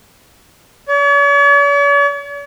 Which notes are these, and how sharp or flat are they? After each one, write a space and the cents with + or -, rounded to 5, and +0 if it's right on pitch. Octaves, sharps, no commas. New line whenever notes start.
C#5 +45